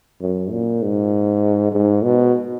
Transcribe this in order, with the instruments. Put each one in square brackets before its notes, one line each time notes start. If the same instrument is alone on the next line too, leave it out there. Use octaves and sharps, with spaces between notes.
[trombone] F#2
A#2
G#2
G#2
B2